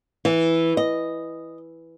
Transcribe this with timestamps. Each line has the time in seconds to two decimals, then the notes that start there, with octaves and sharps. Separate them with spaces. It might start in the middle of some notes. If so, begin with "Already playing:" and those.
0.25 E3
0.77 D#5